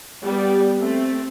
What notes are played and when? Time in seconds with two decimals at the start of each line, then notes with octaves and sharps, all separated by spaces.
0.24 G3 B3
0.81 A3 C4